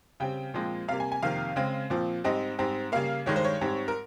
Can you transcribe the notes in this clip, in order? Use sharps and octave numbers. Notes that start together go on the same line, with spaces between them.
C#3 G3 C4 G5
A#2 F3 G#3 C4
C3 G3 A#3 F5
G#5
G#5
F2 C3 D#3 A#3 F5
C#3 G#3 C4
A#2 F3 C4
G#2 G3 C4 D#5
G#2 G3 C4
C#3 G3 A#3 F5
G2 D#3 G#3 C#5
C5
C#5
G#2 G3 C4
A#4